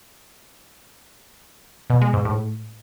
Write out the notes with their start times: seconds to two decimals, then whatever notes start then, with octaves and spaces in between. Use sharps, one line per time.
1.90 B2
2.02 G#3
2.13 G#2
2.25 A2